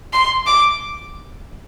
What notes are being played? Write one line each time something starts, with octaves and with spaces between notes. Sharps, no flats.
C6
D6